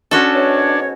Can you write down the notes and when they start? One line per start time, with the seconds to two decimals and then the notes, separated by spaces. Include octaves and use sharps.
0.11 C#4 D4 F#4 A4
0.34 G#2 B2 C#5